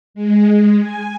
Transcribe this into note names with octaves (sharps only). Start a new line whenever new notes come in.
G#3
G#5